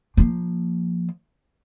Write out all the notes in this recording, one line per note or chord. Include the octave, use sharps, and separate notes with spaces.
F3 A#3